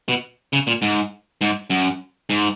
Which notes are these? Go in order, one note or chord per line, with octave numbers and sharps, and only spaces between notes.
B2
C#3
A#2
G#2
G#2
F#2
G#2